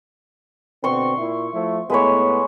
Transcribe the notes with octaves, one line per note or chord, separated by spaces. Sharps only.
B2 D3 C4 C6 C#6
A#2 E4
F3 A3 E4
A2 G#3 B3 B4 C#5